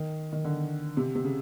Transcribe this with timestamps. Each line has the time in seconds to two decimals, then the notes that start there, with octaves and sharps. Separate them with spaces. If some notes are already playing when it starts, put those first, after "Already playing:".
Already playing: D#3
0.33 D#3
0.45 D3
0.97 C3
1.15 C3
1.24 C#3